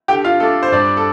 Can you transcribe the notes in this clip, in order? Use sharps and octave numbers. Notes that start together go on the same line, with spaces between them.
D3 G4 G5
F4 F5
A3 D4 A4
C5
G2 D4 D5
A4